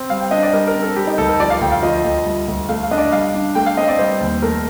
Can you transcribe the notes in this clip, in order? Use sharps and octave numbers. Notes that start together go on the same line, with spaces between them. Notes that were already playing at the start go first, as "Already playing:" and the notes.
Already playing: C4
G3 F5
G5
D4 D#5
D5
G3 A#4
A#4
C4
A4
G3 G4
D#4
D2 A4
A#4
F3 D5
F5
D2 G5
F5
F3 D#5
D2
G3
D2
A3 F5
F5
D4 D#5
D5
G3 F5
D4
A3 G5
F5
C4 D#5
D5
G3 C5
D#2
A3 A#4